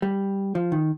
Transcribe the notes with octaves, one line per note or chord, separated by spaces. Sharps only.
G3
F3
D#3